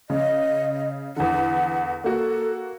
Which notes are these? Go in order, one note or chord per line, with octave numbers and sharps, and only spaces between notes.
C#3 D#5
E2 D3 F#5
A#3 F#4 A4